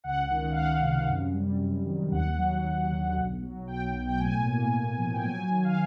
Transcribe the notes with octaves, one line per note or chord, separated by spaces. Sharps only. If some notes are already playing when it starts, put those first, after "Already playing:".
C#2 F#5
D#3
F5
C#2 F#5
C3
F#2
G3
F#2
D#3
D#2 F#5
F#3
D#2
D3
B1
F#3
B1 G5
B2
G5
A2 G#5
A#3
A2
F3
G5
F#3 G#5
D#3
F5